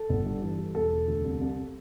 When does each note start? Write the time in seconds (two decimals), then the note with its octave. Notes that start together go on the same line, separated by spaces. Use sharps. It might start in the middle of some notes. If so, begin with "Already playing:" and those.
Already playing: A4
0.09 G1
0.26 G2
0.42 E3
0.59 G3
0.75 E1 A4
0.91 E1
1.08 D2
1.24 C2
1.41 C2